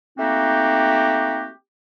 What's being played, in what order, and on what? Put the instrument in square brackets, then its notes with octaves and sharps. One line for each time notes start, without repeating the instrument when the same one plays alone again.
[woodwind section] A3 A#3 C4 D#4 F#4 G4